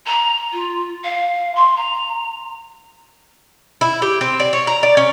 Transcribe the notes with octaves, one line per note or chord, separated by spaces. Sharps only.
A#5
F4
F5
C6
A#5
E4
G4
C4
D5
C#5
A#5
D5
C#4